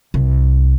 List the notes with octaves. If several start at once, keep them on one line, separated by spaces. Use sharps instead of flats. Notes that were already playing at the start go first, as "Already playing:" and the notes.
C2